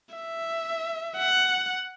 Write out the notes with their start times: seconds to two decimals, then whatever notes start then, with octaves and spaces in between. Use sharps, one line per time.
0.15 E5
1.17 F#5